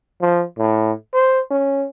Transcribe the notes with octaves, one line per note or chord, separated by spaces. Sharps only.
F3
A2
C5
C#4